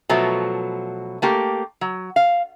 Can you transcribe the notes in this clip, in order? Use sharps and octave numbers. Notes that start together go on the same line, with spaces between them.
B2 F3 F#3 A3 B3
A3 A#3 G4
F#3
F5